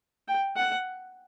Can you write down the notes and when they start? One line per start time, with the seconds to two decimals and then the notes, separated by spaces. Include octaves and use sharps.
0.28 G5
0.57 F#5